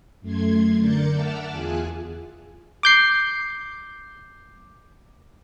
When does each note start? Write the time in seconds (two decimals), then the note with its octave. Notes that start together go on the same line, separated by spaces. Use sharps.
0.21 F#2 A3 C6 G#6
0.79 D3 A#4 D5 G6 A6 C#7
1.10 E5 F#5 A5 D6 E6 F6
1.51 E2 F4 G#4 G#5 F#6
2.83 D6 G6 C7